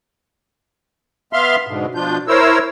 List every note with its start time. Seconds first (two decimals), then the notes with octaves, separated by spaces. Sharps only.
1.33 B3 E5 F5 C6 F6
1.67 G#2 B2 D3
1.95 B2 F3 D4 F4 G6
2.28 E4 A#4 C5 C#5 E6